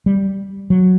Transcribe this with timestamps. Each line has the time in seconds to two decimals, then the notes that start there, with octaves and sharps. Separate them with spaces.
0.06 G3
0.70 F#3